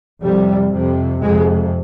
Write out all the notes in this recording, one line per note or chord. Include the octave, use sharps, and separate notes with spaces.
F2 C3 G3
F2 C3
F2 C3 G#3